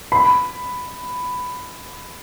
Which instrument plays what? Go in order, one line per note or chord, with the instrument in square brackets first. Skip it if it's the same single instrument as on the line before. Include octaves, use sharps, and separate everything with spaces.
[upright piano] B5